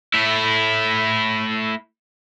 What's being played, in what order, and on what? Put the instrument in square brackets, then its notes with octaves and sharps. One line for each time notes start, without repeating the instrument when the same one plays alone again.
[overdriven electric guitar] A3 E4